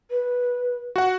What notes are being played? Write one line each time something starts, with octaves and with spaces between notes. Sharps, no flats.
B4
F#4 F#5